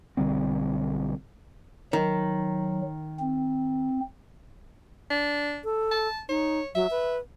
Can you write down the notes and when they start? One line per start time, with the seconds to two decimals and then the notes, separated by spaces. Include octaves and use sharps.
0.17 B1 D3 G3 C4
1.93 D#3 F#3
3.20 C4
5.10 D4
5.64 A4
5.91 A5
6.29 D#4 C#5
6.75 F#3 E5
6.91 B4